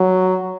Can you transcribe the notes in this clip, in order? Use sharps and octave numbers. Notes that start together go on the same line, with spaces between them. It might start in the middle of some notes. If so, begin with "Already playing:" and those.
Already playing: F#3